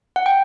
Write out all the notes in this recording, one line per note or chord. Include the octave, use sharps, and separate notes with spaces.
F#5
G5